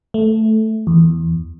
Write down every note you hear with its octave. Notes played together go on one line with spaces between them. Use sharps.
A3
E2